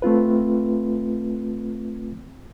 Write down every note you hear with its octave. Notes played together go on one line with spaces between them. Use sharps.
A3 C4 F4 B4